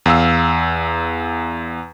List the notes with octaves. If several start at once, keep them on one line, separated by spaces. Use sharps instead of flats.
E2 F5 E6